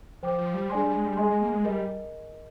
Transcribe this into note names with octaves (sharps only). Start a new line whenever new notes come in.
F3 C5 G5 D6
F3
G3
G#3 D4 G#4 D5 G#5 C6
G3
G#3
G3
G#3 G#4 D#5 G#5 C6
G#3
A#3
G#3
G3 A#4 D#5